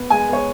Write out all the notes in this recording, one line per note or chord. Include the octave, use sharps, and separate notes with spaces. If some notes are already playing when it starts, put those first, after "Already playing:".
Already playing: B3
G#3 G#5
B3 C#5